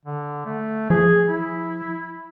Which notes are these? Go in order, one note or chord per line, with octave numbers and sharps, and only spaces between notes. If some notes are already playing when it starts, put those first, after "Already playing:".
D3
A3
F3 G#4
E4